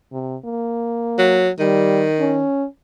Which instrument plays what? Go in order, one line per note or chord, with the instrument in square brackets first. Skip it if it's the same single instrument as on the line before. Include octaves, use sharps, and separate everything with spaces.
[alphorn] C3
A#3
[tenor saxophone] F#3
[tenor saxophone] D#3 [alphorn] G3
[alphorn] C#4